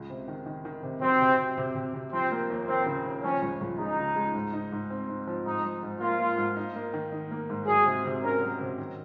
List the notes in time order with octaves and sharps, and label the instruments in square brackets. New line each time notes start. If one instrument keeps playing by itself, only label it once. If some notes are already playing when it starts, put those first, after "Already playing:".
Already playing: [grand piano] C#2
C3
D#3
D#3
D#3
C3
[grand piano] F#3 [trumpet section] C4
[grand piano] C3
C3
C3
C3
C3
[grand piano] F3 [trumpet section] C4
[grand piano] A#3
D#2
[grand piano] A#3 [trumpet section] C4
[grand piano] C#3
D#2
[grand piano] F3 [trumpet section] C#4
[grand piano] C#2
C#2
[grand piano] G#3 [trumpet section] D#4
[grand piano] C#3
G#3
G#2
D#4
G#2
C4
D#4
F3
[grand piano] G#2 [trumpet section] D#4
[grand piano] G#2
G#2
[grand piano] A#3 [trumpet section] F4
[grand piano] A#3
G#2
D#4
A#3
D#3
D#4
A#3
G#2
[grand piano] F#3 [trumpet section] G#4
[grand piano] C3
C3
[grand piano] C#4 [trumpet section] A#4
[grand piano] F#3
C3
D#3